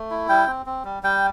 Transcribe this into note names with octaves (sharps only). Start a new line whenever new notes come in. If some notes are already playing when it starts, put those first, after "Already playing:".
Already playing: A3
E4
G3 G5
C4
C4
G3
G3 G5